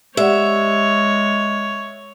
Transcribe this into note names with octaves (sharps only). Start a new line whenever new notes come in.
G#3 G4 C#5 D5 E5 F#5